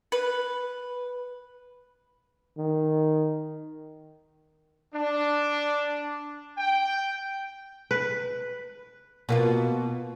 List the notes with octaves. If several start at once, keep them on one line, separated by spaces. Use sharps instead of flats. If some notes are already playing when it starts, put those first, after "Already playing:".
B4
D#3
D4
G5
B4
B2 A#3 F4